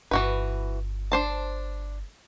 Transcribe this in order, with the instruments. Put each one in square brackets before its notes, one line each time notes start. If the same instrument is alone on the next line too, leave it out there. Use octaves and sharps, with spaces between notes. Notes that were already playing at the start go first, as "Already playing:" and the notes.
[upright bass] G1 F4 [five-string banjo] E3 F#4 B4
[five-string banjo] D4 C5 A5